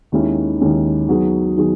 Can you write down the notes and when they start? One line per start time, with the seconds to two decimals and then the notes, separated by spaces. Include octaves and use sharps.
0.12 D#2 D#3 G#3 C#4 E4
0.61 D#2 D#3 G#3 C#4 E4
1.08 D#3 F#3 B3 D#4 G#4
1.57 D#3 F#3 B3 D#4 G#4